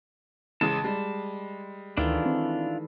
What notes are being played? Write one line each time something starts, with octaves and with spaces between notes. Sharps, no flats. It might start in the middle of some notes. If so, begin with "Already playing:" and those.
A1 C#3 G#3 A5
G3 G#3
D2 D#3 E3 A3 D4 E4 F4
C4